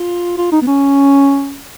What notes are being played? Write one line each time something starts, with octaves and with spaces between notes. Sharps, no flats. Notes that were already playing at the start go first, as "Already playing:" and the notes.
Already playing: F4
F4
D#4
B3
C#4